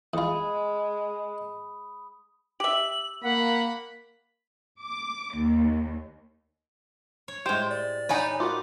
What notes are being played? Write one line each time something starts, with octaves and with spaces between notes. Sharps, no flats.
E2 G#3 F4 B5 D#6
G4 E5 F#7
A#3 F#5 B5
D6
D#2
C#5
A2 G#3 G4 C5 C6 G6
D5
D#4 G4 B4 C#5 G#5
F4 F#4 A#4 D6